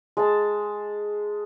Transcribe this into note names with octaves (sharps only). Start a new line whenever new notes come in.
G#3 A5